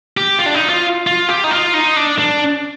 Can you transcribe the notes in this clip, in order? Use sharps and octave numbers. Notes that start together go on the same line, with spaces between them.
G4
F4
D4
D#4
F4
F4
G4
D#4
F4
D#4
D4
D4